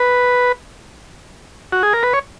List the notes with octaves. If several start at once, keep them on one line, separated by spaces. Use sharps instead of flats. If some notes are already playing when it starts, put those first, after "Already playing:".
Already playing: B4
F#4
G#4
A#4
B4
C#5